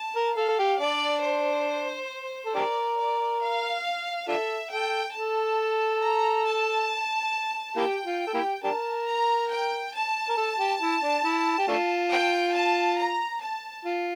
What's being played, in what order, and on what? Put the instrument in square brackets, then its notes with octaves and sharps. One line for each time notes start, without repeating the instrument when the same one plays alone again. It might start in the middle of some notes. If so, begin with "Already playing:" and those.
Already playing: [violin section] A5
[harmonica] A#4
[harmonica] A4 [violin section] F5
[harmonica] A4
G4
[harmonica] D4 [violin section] D5
[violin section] C5
[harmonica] A4
[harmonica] D4 G4 A#4 [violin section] D5
[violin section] D5
F5
[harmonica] D4 F4 A4 [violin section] E5
[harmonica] A4 [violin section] G5
[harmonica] A4 [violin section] A5
[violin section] A#5
A5
[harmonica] A#3 E4 G4 [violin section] G5
[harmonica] F4
A4
A#3 E4 G4
[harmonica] D4 G4 A#4 [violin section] A5
[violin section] A#5
G5
A5
[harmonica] A#4
A4
G4
E4
D4
E4
G4
A3 D4 F4
[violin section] G5
A5
A#5
A5
[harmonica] F4